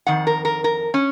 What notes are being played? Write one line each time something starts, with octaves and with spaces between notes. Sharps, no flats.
F2 D#3 F#5
A#4
A#4
A#4
C#4